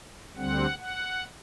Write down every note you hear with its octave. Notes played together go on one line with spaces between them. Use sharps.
D2 D3 G3 C4 F#5
F#5